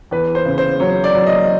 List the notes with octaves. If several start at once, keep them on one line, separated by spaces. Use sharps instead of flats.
E2 B4
C5
C#3
C5
F#3 C#5
D5
F#3
D#5